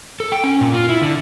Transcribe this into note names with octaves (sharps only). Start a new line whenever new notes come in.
A4
G5
C#4
A#2
F4
E4
D3